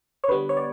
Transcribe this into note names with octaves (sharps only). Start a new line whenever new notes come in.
C#5
D3 G3 B3 B4
C#5
D5